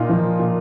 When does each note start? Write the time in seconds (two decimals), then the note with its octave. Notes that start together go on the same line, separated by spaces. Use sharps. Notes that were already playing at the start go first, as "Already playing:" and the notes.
Already playing: A#2 D#4 F4
0.09 F3
0.40 A#2